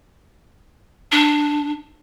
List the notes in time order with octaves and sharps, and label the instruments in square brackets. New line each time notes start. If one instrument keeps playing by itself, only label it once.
[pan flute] D4